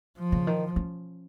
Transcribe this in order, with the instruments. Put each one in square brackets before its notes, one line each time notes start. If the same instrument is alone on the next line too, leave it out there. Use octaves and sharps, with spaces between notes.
[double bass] F3
[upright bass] C#3
D#3
C#4